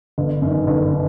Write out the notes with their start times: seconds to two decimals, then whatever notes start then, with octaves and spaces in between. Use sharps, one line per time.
0.18 G1
0.42 F#2 D#3
0.67 G1
0.93 D#3